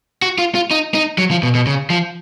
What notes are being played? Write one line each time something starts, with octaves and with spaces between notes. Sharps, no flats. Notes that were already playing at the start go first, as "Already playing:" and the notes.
F#4
F4
F4
D#4
D#4
F#3
F3
B2
B2
C#3
F3